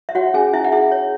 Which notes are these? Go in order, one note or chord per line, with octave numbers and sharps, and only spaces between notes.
E5
F#4 C#5 F#5
C#4 G#4 G#5
C#4 E4 E5
F#5
E4 G#4 E5
C#5